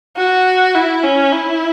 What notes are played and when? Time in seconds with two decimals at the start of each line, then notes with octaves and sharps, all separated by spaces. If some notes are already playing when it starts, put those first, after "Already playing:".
0.17 F#4
0.75 E4
1.03 C#4
1.33 E4